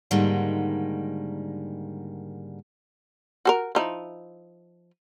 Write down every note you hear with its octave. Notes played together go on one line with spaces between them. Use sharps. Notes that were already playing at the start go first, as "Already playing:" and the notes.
G#2 D3 D#3 G3 G#3 A#3
F#4 A4 A#4
F3 D#4 E4